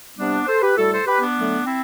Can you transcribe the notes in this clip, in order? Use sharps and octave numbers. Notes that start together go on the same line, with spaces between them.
C3 G3 B3 D4
A4 C5
G4 B4
A2 G3 F#4 A4
A4 C5
G4 B4
B3 D4
D3 F#3 A3
C4 E4